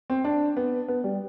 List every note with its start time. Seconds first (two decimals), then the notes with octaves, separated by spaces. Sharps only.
0.10 C4
0.24 D4
0.57 B3
0.88 B3
1.04 G3